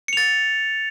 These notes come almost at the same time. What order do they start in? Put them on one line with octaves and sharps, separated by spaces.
C#7 F7 A6